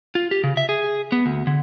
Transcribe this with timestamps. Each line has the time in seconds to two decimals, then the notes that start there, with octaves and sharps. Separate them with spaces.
0.15 F4
0.31 G4
0.44 C#3
0.57 E5
0.69 G#4
1.12 B3
1.26 D2
1.47 D3